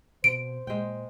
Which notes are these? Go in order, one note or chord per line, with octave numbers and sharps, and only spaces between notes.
B2 C4 C5 D7
A#2 G#3 G5